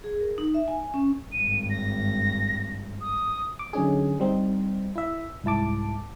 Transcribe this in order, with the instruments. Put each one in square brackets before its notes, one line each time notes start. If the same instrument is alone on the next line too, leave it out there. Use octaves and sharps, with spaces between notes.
[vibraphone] G#4
A#4
D#4
E5
G#5
C#4
[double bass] G#1 G2 [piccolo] D#7
[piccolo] A#6
D#6
[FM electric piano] D6
D3 F#3 C#4 D#4 G#4
G3 C4 D#4
E4 E5
C2 G#2 E4 A5 D6